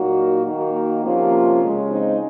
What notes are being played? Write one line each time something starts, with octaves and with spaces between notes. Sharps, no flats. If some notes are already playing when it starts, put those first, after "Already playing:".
Already playing: A#2 F#3 A#3 D#4 F#4
D#3 A#3 D#4 F#4
C3 F3 A#3 C#4 F4
C#3 G#3
C4 D#4